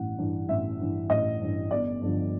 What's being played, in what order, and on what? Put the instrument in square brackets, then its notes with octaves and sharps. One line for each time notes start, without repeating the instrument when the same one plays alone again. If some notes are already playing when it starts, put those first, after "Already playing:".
Already playing: [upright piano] A1 G2 E3 F#5
G2 E3
A1 E5
G2 E3
A1 D#5
G2 E3
G1 D5
G2 D3 F3